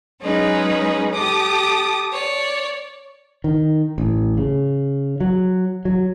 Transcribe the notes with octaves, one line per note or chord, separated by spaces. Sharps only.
F#3 G#3 C#4 D#4 G#4 B4
G4 A4 D6 D#6
C#5 D5
D#3
A1
C#3
F#3
F#3